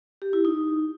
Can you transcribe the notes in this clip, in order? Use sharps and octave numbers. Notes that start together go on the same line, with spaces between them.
G4
E4
D#4